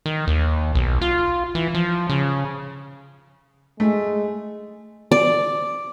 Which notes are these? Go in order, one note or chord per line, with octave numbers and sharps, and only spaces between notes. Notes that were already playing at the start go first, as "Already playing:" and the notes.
D#3
D#2
B1
F4
E3
F3
C#3
G#3 A3
D5